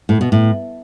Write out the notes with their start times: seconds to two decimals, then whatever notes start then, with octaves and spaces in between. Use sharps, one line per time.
0.09 A2
0.21 B2
0.32 A2